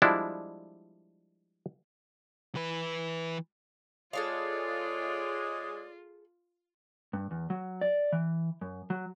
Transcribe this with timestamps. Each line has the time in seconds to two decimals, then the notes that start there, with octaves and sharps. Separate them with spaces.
0.02 F3 G3 G#3 D4 E4
2.55 E3 B4
4.13 G#3 F4 G#4 A4 C#5 D5 F5
7.13 G2
7.31 E2
7.50 F#3
7.81 D5
8.12 E3
8.61 F#2
8.90 F#3